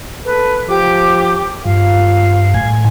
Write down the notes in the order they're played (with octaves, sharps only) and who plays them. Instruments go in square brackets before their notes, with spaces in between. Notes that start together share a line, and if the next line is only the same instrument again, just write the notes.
[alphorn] A4 [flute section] B4
[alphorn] F3 [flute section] G4 D6
[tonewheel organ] G2 [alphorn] F4 [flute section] F5
[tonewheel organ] A2 G#5